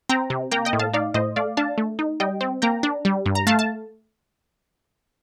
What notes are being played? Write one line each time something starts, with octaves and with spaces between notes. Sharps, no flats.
C4 G5 A#5
C3
A#3 G5 A#5
D#5 G5
A2
F5 A5
D#4 D5 F5
A2 C5 D#5
A3 D5 F5
D4 F5 A5
A3
D#4
G3 D#5 G5
C4
A#3 G5 A#5
D4
G3
G2
A#5
A3 F5 A5
A5